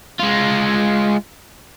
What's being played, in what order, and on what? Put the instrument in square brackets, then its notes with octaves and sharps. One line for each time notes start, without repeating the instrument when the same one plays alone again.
[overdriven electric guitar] G#3 F4